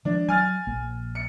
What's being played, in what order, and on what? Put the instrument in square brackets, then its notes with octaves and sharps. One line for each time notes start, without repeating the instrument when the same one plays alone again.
[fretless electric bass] D#3 F3 G#3 [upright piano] D4
[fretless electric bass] F#3 [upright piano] G#5 F6 A6
[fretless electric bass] A#1 A#3
[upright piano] C#7